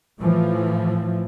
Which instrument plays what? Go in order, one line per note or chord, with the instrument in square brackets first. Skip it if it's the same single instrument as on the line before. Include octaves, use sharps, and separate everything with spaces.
[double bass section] A2 E3 F3